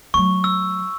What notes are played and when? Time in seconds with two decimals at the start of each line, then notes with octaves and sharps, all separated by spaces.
0.14 F#3 A3 C#6
0.44 E6